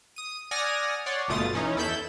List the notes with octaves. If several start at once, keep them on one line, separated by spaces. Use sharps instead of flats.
D#6 D#7
D5 F#5 G#5 D#6 F6 A#6
C#5 D5 F#5 C6
G1 B2 A3 F4 D#6 A6
E3 C#4 D#4
E2 E4 A4 B5 G6 E7